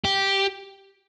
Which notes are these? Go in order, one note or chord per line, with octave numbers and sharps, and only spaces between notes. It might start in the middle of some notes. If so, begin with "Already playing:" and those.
G4